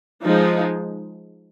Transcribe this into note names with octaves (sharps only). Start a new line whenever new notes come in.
F3 G#3 D#4